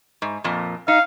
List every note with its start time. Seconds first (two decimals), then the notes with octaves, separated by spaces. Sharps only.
0.22 G#2
0.44 F2 A#2
0.88 D#4 F5